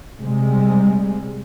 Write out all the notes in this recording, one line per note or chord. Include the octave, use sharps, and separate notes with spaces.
C3 G3 G#3